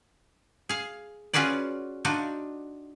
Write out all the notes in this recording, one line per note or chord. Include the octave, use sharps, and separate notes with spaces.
G#4 F5
C#4 F4 F#4 G#4 B4 D5
D4 D#4 F4 F#4